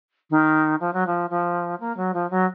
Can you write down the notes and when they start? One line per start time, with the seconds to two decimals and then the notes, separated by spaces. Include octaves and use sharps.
0.30 D#3
0.80 F3
0.93 F#3
1.06 F3
1.30 F3
1.80 A#3
1.97 F#3
2.14 F3
2.30 F#3